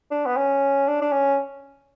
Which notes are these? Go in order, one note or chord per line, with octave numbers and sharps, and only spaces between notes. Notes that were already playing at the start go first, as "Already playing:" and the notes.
D4
B3
C#4
D4
D4
C#4